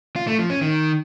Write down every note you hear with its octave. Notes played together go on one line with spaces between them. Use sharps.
F4
A3
F3
C#4
D#3